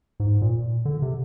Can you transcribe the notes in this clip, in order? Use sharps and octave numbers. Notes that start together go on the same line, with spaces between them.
G#2
A#2
D3
C3